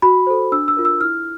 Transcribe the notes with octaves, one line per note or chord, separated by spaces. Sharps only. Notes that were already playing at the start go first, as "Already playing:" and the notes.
F#4 B5
A4 C5
D4 E6
E6
F4 A#4
E6
E4 F6